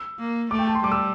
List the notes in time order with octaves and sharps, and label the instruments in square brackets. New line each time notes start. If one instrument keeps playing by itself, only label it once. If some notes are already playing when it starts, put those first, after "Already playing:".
Already playing: [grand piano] E6
[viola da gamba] A#3
[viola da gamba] A3 [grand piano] D6
[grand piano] G5
A5
C6
[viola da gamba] G3 [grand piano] D6
[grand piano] E6